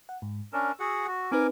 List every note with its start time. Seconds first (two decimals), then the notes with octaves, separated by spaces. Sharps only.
0.09 F#5
0.22 G#2
0.53 C#4 D4 A#4 E6
0.80 F#4 G#4 F#5
1.07 F#4
1.32 C4 D#4 A#4 B4 G#5 D6